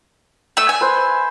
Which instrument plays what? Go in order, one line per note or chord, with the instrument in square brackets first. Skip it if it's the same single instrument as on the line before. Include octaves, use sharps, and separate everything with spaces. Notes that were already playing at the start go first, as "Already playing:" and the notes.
[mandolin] A3 E6 [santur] E5
[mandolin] G#5
[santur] B4 C5 E5